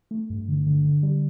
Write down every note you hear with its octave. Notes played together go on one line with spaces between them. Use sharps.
A3
G2
D3
D3
D3
G3